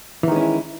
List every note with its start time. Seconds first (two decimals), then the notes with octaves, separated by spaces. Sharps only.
0.23 E3
0.28 D#3
0.32 G#3
0.36 C#4
0.40 E4